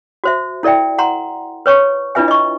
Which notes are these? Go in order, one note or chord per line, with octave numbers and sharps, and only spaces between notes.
F#4 C5 E5
E4 A4 D5 E5 G5
F#5 A#5 C6
B4 C#5 C#6
D4 E4 F4 B4 E5 G#5
D#5 C#6